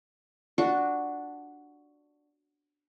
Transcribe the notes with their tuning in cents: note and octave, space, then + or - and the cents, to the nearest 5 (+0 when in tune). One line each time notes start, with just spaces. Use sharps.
D4 +0 F#4 +0